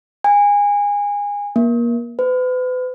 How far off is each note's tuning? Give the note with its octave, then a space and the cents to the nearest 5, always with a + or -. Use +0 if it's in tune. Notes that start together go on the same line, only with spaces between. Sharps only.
G#5 -25
A#3 +25
B4 +40